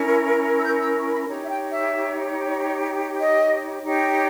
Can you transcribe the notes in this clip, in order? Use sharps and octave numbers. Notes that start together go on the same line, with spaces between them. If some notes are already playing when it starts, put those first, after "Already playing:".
Already playing: C#4 E4 A#4
E6
G6
E6
C#6
B5
D#4 G4 C#5 A#5
E5
G5
E5
D#5
D#4 G4 C#5